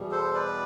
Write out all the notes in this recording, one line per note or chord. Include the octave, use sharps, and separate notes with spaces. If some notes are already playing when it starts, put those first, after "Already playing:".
Already playing: E2 B2 G3
A4 C5
B4 D5